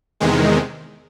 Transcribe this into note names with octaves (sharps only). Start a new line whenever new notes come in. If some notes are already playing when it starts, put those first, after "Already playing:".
E2 C3 D#3 G#3